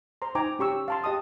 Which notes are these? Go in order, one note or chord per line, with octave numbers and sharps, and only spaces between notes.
C5 A#5 C6
D#4 C5 G5 G#5 A#5 D6
C#4 G4 C#6 E6
F5 A5 C6
G4 D#5 A5 D#6